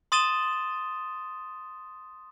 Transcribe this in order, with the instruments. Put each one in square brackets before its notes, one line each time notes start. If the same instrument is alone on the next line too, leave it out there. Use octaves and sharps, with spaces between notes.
[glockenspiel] C6 D#6 A6 D#7 E7 G7